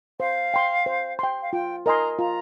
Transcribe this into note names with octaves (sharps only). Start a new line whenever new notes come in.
C5 F5
G5 C6
C5
G5 C6
F5
F4 G5
A#4 D#5 G#5 A#5 C6
F4 A#5